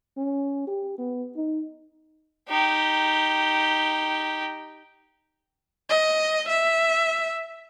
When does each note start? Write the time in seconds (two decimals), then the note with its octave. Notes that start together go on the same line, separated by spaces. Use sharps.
0.17 C#4
0.67 G4
0.98 B3
1.36 D#4
2.49 D#4 G4
5.89 D#5
6.48 E5